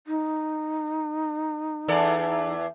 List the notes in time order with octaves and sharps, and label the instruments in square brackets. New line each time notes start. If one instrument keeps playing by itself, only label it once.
[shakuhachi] D#4
[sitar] E2 A4 D5